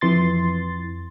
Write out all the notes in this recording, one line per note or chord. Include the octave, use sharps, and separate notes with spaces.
F2 E3 C6 A6